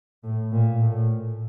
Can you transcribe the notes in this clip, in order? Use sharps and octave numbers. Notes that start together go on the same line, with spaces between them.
A2
A#2
A2